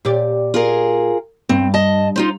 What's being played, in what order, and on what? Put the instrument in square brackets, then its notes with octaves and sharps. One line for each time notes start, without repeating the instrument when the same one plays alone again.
[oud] A#2 G4 D5
[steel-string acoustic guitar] F4 G#4 A#4
[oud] G2 [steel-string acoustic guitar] C4
[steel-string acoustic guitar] D#5 A5
D#4 F4 C5